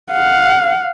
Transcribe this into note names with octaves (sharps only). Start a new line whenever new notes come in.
F5 F#5